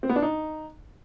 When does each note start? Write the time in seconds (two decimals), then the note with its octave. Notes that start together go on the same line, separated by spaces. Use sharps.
0.03 C4
0.09 B3
0.16 D4
0.22 D#4